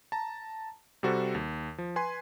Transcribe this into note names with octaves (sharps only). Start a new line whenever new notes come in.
A5 A#5
C3 G3 F#4 A4 C5
D#2
F3
B4 G#5 C6